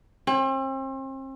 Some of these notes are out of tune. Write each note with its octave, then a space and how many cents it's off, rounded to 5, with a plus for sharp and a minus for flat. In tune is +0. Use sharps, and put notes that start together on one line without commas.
C4 +40